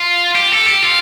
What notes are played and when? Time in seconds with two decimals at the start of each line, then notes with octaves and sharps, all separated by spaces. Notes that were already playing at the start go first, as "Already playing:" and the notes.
Already playing: F4
0.35 G4
0.52 A4
0.67 G4
0.83 F4